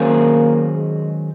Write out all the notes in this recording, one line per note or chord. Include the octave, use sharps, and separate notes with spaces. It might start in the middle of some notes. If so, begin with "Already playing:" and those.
Already playing: D#3 F#3 A#3 C#4 G#4 C5
G#3